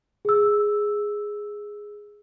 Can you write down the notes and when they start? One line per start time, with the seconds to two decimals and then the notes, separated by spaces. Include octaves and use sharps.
0.25 G#4 E6